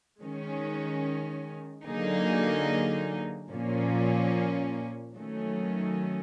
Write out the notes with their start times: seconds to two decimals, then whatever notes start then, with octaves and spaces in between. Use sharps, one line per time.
0.21 D#3 G#3 C#4
1.86 D3 F#3 A#3 D#4 G#4
3.51 A#2 F3 A#3 C#4
5.15 D#3 F#3 A3 C#4